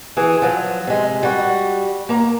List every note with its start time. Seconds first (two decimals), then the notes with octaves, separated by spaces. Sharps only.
0.17 E3 G#4
0.42 F3 F#3
0.87 C3 G#3
1.23 G3 F#4
2.09 A#3 A#5